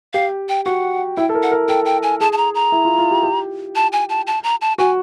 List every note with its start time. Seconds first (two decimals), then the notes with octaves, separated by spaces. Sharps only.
0.13 G4 F5
0.49 G5
0.65 F#4 F#5
1.17 E4 G5
1.29 A4
1.35 A#4
1.43 F#5
1.52 A#4
1.68 A4 G5
1.86 G5
2.03 G#5
2.20 G#4 A5
2.33 A5
2.37 A#5
2.55 A#5
2.72 E4
2.85 F4
2.98 F4
3.11 G4
3.23 G4
3.75 A5
3.92 G#5
4.09 A5
4.27 A5
4.44 A#5
4.61 A5
4.78 F#4 G#5